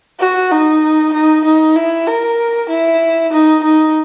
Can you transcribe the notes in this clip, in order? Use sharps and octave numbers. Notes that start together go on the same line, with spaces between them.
F#4
D#4
D#4
D#4
E4
A#4
E4
D#4
D#4